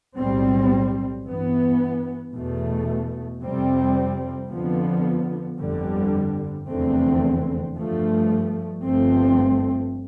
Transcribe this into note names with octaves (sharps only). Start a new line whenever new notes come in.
B1 A2 G3 C4
G2 E3 B3
E2 B2 A3
F2 C3 G3 C4
F2 D3 F3 B3
G1 F2 D3 G3
F1 E2 D3 A3 C4
G2 F3 A3
G1 G2 F3 A3 C4